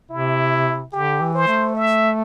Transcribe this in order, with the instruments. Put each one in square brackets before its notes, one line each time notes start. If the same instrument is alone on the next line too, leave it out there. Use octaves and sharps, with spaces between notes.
[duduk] C3 [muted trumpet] E4
[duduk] D3 [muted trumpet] G4
[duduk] E3
[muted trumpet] C5
[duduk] A3
[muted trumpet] E5